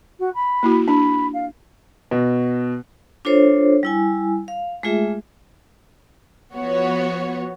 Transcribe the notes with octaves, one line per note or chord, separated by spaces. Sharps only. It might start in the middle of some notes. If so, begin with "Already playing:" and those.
F#4
B5
A#3 E4 F#4
D4 B5
F5
B2
D4 F4 A4 C5 C#5
G3 E4 G#5
F5
G#3 A3 F4 G#4 E5
F3 B3 F#4 C#5